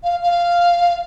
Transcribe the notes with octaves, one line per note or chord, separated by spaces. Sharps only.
F5
F5